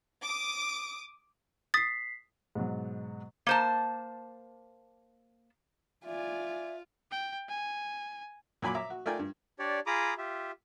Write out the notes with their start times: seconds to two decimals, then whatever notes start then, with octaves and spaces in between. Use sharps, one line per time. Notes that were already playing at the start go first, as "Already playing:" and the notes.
0.22 D6 D#6
1.74 D#6 A6 B6 C7
2.55 G#2 B2 F#3
3.47 A#3 C5 A5
6.05 F4 D5 E5 G#5
7.11 G5
7.49 G#5
8.62 A#2 F#3 G#5 B5 D6
8.75 E5 A#5 D6
8.90 F#4
9.06 A3 F4 A#4 D5 G5 G#5
9.19 G2
9.59 D4 G4 C#5 D5
9.87 F4 G#4 A#5 B5 D6 D#6
10.18 F4 G4 E5